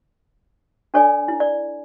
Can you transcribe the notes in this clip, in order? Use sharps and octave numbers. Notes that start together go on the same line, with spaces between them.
D4 A4 C#5 D5 G#5
E4
D5